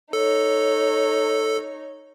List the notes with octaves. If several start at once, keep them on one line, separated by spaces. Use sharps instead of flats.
D#4 A4 C#5